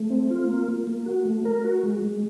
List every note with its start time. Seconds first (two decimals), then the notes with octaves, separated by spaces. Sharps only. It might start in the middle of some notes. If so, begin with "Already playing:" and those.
Already playing: A3
0.10 C4
0.30 F4
0.49 A#3
0.68 A#3
0.87 A#3
1.06 F#4
1.25 A3
1.45 A#4
1.64 F#4
1.83 G#3
2.02 G#3